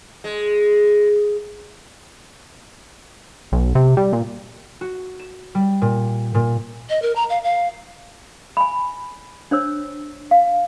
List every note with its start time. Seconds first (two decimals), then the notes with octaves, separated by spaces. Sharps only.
0.24 G#3
3.52 B1
3.75 C3
3.97 G3
4.13 A#2
4.81 F#4
5.19 E7
5.55 G3
5.82 A#2
6.34 A#2
6.90 D#5
7.02 A#4
7.16 A#5
7.30 F5
7.44 F5
8.57 G#5 B5
9.51 D4 C5 C#5 E6
10.31 F5